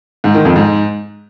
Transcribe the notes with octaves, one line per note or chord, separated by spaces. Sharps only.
G#2
D#3
F2
G#2